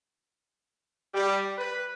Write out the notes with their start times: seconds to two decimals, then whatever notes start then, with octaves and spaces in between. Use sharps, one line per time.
1.14 G3
1.58 B4